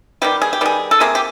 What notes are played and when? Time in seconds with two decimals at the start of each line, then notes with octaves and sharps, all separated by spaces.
0.22 D#3 G3 B3 G4
0.42 G#4
0.53 G4
0.61 D#3 G3 B3 G#4
0.91 A4
1.00 C3 F3 A#3 G#4
1.15 G4